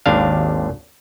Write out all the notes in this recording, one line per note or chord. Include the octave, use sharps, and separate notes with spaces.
G#1 D#2 D4 F5